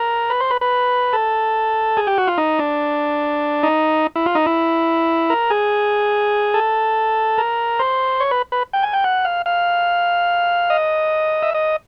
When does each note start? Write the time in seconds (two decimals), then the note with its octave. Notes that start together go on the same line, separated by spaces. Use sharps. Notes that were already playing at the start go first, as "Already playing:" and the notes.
Already playing: A#4
0.30 B4
0.40 C5
0.51 B4
0.61 B4
1.13 A4
1.97 G#4
2.07 G4
2.18 F#4
2.27 F4
2.38 D#4
2.59 D4
3.63 D#4
4.16 E4
4.26 F4
4.35 D#4
4.46 E4
5.30 A#4
5.50 G#4
6.54 A4
7.38 A#4
7.79 C5
8.20 C#5
8.31 B4
8.52 B4
8.73 G5
8.83 G#5
8.93 G5
9.04 F#5
9.25 F5
9.46 F5
10.70 D#5
11.43 E5
11.54 D#5